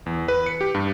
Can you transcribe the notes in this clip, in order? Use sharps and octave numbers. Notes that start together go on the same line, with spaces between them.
E2
B4
C#7
G4
G2